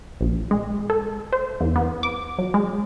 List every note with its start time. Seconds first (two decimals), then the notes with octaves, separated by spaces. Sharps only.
0.21 A#1
0.51 G#3
0.90 A4
1.33 C5
1.61 E2
1.76 B3
2.03 D6
2.38 F#3
2.54 G#3